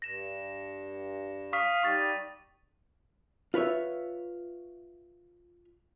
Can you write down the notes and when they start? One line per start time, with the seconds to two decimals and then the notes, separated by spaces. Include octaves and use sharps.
0.02 G2 A#6 E7
1.53 F5 C#6 D#6 B6
1.83 G3 D#4 G4 C#6 D#6 A6
3.54 F4 B4 C#5 E5